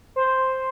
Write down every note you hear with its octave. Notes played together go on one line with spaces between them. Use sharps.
C5